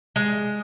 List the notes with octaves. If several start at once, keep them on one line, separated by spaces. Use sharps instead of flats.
G#3